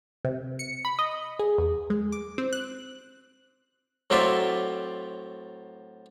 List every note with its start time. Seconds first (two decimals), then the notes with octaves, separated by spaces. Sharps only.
0.25 C3
0.59 C#7
0.85 B5
0.99 D#5
1.39 G#4
1.58 E2
1.90 G#3
2.12 D6
2.38 C4
2.53 F#6
4.10 A2 F#3 C4 F4 D5 E5